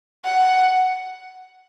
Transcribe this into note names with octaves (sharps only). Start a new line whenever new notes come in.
F#5